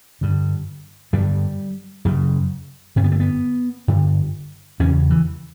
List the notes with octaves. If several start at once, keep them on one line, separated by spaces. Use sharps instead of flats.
G2 D3
G2 D3 G3
F#2 C#3
G2 D3 C#4
B3
A3
B3
G2 D3
E2 C#3 C#4
E3